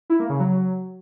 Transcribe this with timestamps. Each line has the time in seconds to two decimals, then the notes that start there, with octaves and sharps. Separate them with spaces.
0.10 E4
0.20 A#3
0.29 C#3
0.39 F#3